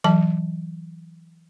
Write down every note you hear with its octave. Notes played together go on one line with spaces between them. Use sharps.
E3 F#3 A5